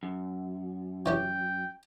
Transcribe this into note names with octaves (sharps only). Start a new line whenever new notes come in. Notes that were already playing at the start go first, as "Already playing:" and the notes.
F#2
E3 C#4 G4 G5